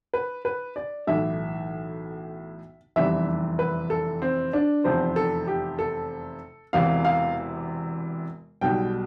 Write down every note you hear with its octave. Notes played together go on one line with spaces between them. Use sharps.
B4
B4
D5
B1 A2 E3 E5
F1 E2 C3 E3 G3 E5
B4
A4
C4
D4
F1 E2 C3 F3 C5
A4
G4
A4
E1 E2 C3 E3 F5
F5
B1 B2 G3 G5